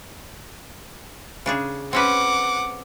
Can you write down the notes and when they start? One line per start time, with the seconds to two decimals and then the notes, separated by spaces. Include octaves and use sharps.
1.46 C#3 D4 G#4
1.93 C4 C#4 B4 F#5 D6